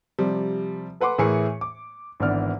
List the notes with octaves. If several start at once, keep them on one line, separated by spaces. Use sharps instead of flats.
C3 F3 G3
A4 B4 F#5 C6 D6
A2 E3 G#4 A#4 C#7
D6
G#1 D3 E3 B3 D5 F6